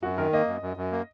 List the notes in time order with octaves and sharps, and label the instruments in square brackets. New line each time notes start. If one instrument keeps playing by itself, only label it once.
[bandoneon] F#2 [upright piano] F#4
[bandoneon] D#3 [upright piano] A#4
[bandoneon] A#3 [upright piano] D#5
[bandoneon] F#2
F#2
F#2
A#3